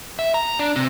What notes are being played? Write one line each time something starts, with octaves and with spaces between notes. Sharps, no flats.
E5
A#5
D4
C3